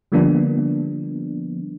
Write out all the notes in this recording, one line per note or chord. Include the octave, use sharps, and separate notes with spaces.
D3 F3 G3 A#3 B3 D4